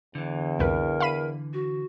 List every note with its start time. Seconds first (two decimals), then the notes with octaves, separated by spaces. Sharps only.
0.15 E2 D3 E3
0.59 C2 F2 A#4 B4
1.00 F5 B5 D#7
1.53 F#4